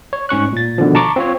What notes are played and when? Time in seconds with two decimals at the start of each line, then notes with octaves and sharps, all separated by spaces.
0.13 C#5
0.29 G#2 C#4 C#6 F#6
0.53 A#2 A6
0.78 B2 D3 D#3 F3
0.95 A5 A#5 C#6 D6
1.16 C4 F4 C#5